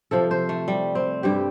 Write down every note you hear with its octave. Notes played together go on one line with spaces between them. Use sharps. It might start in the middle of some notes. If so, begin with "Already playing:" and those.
C3 F3 A4
C5
A3
G3
C4
G2 G3 G4